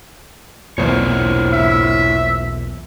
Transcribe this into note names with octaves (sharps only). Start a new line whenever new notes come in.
B1 E2 A#2 E4 C5 C#5
E5